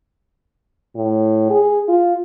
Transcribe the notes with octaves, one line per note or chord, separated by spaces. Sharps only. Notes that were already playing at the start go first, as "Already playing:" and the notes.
A2
G#4
F4